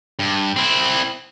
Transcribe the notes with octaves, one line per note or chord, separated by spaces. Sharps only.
G2
C4 E4